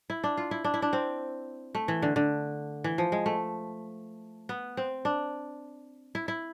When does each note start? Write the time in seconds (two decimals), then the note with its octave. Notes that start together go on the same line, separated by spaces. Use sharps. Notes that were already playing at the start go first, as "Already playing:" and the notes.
0.10 E4
0.24 D4
0.37 F4
0.51 E4
0.64 D4
0.74 E4
0.82 D4
0.93 C4
1.75 A3
1.88 E3
2.02 D3
2.16 D3
2.84 E3
2.98 F3
3.12 G#3
3.26 A3
4.49 B3
4.77 C4
5.05 D4
6.15 E4
6.28 E4